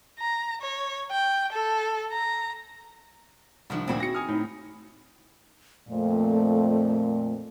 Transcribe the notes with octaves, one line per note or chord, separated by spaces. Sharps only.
A#5
C#5
G5
A4
A#5
C2 G2 D#3 F3
D2 A#2 C4 E4 G#4 C5
F#4 A#6 C#7
G#5 D#6 F6
A2 D#4
F2 A#2 A3